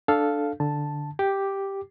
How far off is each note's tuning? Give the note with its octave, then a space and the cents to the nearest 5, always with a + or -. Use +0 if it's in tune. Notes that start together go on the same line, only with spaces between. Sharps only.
D4 +10 A4 -5 F5 +0
D3 +0 A5 +0
G4 +0 D6 +0